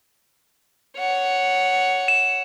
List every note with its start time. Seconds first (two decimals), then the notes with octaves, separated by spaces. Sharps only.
0.99 C#5 F#5
2.08 E7